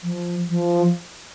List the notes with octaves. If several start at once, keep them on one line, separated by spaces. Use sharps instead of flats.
F3
F3